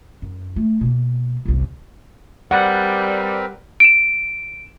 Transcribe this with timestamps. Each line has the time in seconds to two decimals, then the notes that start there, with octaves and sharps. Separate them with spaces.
0.22 F#2
0.56 A3
0.81 B2 A#3
1.45 G1 C2
2.51 G3 C4 A#4 B4 D5 F#5
3.80 D7 E7